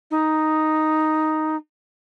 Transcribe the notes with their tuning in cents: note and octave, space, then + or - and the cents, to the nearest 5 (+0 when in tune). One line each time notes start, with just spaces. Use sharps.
D#4 +0